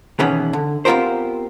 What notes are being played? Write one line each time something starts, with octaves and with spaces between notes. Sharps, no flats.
B2 D#3 E3 B3 C#4 G#4
D3
B3 C4 F4 G4 A#4 C5